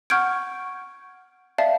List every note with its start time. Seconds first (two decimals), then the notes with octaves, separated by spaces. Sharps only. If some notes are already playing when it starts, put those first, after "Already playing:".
0.10 F#5 C#6 F6 G6 G#6 D7
1.58 D5 E5 F5 A5